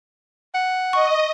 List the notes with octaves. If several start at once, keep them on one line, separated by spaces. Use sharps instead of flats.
F#5
D#5 C#6